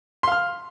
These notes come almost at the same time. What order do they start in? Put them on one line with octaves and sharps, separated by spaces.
C6 F5 F6